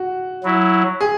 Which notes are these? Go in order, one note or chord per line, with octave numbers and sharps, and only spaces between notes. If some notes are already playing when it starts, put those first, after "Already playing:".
Already playing: F#4
F#3 E4
G#4